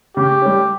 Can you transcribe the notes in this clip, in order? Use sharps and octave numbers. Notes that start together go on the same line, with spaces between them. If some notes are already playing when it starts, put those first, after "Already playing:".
C#3 G4
G3 C#4